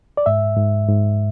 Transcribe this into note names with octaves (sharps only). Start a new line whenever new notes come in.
D5
G#2 E5
G#2
G#2